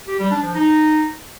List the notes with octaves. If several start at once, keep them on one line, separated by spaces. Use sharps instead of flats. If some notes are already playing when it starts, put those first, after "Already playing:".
G4
G3
D4
F3
D#4